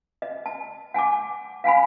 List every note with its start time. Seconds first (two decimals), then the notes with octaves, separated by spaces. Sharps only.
0.22 D#5
0.46 A5
0.94 F#5 G#5 A5 D6
1.64 F5 F#5 G#5 B5